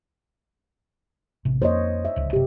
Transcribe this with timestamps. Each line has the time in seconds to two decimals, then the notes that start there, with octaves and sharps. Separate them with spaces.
1.45 A1 C3
1.62 F2 A#3 C5 C#5 D#5
2.05 E5
2.16 D1 C#2
2.33 F#1 C3 G4